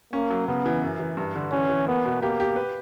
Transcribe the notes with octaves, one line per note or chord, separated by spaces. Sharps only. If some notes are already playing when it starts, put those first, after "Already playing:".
A#3 C#4
F#3
C#3 B3
E3
F#2
E3
G2
D3
E3 C#4
E3
A#3 B3
B2
A#3 G4
G4
B4